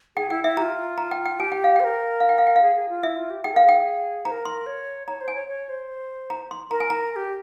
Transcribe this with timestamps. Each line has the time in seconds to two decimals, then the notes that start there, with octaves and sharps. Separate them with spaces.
0.17 G#4 G5
0.30 E4 G5
0.44 E4 E5
0.57 G4 A#5
0.62 F4
0.98 A#5
1.11 G5
1.26 G5
1.39 G4 G#5
1.52 G5
1.64 F5
1.76 C5 G5
1.84 A#4
2.20 F5
2.29 G5
2.38 F5
2.47 G5
2.56 F5
2.62 G#4
2.76 G#4
2.89 F4
3.03 E4 E5
3.17 F4
3.30 G4
3.43 G#4 G5
3.54 A#4 F5
3.64 G#4 G5
4.25 C5 A#5
4.31 A#4
4.45 C6
4.66 C#5
5.07 C#5 A#5
5.21 C5
5.28 G#5
5.35 C#5
5.48 C#5
5.69 C5
6.30 A#5
6.51 C6
6.71 A#4 A#5
6.80 G#5
6.90 A#5
7.12 A#4
7.16 G4